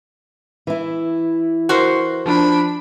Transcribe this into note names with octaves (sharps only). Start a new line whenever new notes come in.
E3 E4
F#4 A#4 C5
F3 D4 B5